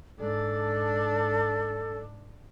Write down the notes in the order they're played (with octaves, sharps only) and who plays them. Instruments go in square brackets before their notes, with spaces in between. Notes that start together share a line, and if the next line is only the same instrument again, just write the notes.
[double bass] G#2 D4 [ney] A4